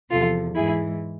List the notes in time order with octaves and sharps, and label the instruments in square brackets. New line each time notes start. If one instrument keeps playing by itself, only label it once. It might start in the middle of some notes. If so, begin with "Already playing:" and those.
[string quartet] E2 C3 F3 F4 A4
G#2 E3 E4 G#4